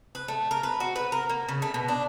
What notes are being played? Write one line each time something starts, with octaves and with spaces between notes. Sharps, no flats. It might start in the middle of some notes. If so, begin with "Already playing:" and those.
B4
A3
A#4
B4
F#4
B4
A#4
A#3
C#3
A3
B2
D4